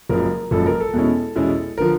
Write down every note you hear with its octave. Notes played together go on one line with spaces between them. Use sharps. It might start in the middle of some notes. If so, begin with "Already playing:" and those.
F#1 F#2 C#3 F3 G#3 A#4
F#1 F#2 C#3 F3 G#3 A4
A#4
A4
E2 B2 G#3 C#4 E4
E2 B2 G#3 C#4 E4
D3 F3 A#4